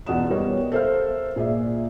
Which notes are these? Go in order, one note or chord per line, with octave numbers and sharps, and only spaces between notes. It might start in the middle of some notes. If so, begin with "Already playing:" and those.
E2 B2 D5 F#5 D#6 E7
G3 B3 A#4 C#5 D#5
A4 A#4 C5 E5 F5 F6
A#2 G#4 D5 E5